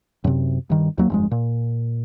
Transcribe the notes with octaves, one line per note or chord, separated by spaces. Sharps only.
F#2 C3
G2 D#3
D#2 F#3 A#3
G1 F2 G#3
A#2